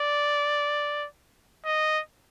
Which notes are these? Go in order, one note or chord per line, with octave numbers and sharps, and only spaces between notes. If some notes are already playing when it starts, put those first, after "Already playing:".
Already playing: D5
D#5